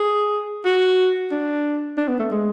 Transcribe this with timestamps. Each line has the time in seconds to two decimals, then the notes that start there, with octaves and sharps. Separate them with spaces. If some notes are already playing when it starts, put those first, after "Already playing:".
Already playing: G#4
0.65 F#4
1.31 D4
1.97 D4
2.08 B3
2.19 A3
2.31 G#3